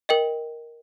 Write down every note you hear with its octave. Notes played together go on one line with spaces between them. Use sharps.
A#4 D#5 G5